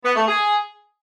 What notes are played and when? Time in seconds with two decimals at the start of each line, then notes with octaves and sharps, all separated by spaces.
0.04 B3
0.16 A3
0.27 G#4